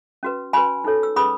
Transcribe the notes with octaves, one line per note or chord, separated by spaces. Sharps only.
C#4 F#4 B4
C#4 F#4 B4 G#5 B5
D#4 A4 C#5
E6
C#4 G#4 B4 B5 D#6